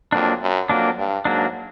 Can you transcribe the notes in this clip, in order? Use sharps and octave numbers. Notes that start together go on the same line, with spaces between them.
F2 F#3 A#3 D4
F#2
F2 F#3 A#3 D4
G2
G#2 F#3 A#3 D4